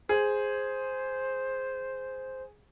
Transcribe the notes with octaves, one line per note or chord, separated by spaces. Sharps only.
G#4 C5